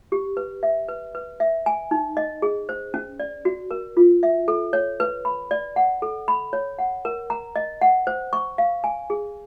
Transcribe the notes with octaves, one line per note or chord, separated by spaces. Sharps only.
G4
B4
E5
B4
B4
E5
G#5
D#4
D#5
G#4
C5
C#4
D5
F#4
A#4
F4
E5
A4
C#5
B4
B5
D5
F#5
A4
B5
C#5
F#5
A#4
A#5
D#5
F#5
C5
C#6
F5
G#5
G#4